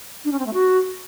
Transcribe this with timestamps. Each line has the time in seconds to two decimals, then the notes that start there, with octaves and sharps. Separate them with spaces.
0.24 D4
0.31 C#4
0.39 C4
0.46 A3
0.53 F#4